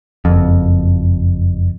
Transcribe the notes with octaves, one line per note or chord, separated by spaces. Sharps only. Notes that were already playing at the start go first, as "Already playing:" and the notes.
F#1 F2